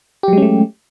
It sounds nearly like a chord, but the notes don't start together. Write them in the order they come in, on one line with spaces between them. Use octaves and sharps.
G4 F#3 G#3 C#4 A3